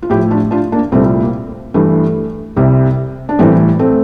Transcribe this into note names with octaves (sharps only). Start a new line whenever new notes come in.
F4
A2 F3 E4 G4
D4 F4
D4 F4
A#3 D4
C2 A#2 G3 A3 C4
A#3
G2 E3 G3 A3
C2 C3 G3
D4
A2 E3 G3 A3 C4
A3 C4